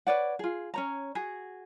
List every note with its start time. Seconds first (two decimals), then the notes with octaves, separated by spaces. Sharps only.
0.07 B4 C#5 D5 F#5
0.39 F4 G#4
0.74 C#4 C#5 A#5
1.15 F#4 G#4